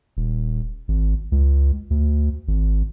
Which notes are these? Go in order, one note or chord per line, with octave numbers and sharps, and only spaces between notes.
D#1
G#1
C#2
D2
G#1